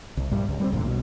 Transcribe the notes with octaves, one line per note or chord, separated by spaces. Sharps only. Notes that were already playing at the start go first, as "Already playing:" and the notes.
C2
A#1 G2 G3
C#2
G3 A#3 C4
G1 E2 A#2 D3
B1 B2